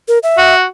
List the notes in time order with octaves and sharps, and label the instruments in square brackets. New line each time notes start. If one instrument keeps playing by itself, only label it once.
[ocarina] A#4
E5
[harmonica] F#4